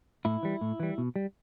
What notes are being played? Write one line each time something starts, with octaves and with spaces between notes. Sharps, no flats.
A2 E4
E3 G3
A2
E3 G3
B2
G3